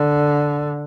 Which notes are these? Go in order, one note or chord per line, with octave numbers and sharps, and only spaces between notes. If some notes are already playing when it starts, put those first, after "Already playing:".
Already playing: D3